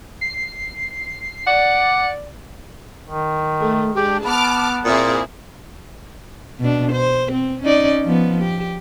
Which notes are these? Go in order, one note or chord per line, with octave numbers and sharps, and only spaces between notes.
C7
D5 F#5
D#3
A3
G#3 D4 G4
B3 A5 B5 D6 F6
A#2 C4 E4 G#4 D#6
B2 D4
C5
C4
C#4 D#4 D5
F3 B3
G4